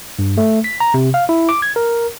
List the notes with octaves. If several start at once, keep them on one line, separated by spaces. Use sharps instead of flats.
G2
A3
B6
A#5
C3
F5
E4
D6
G#6
A#4